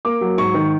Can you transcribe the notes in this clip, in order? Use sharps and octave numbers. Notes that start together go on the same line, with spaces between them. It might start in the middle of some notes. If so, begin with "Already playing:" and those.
A#3 D6
F#3
G#2 C#6
D#3